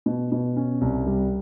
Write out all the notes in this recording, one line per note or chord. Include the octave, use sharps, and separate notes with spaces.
B2
B2
C#4
C2
G3